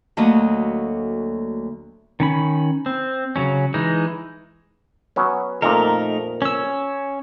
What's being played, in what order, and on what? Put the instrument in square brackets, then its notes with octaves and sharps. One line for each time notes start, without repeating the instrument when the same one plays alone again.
[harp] D2 F#3 A3 A#3 D#5
[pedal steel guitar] D#3 C#4 B5
C4
C#3 F#3 C#4
E3 G#3 D#4
[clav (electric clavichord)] F#3 B3 C#4
[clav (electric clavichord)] F2 A#2 F3 [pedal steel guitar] A3 D#4 A#4
[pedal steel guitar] C#4 E6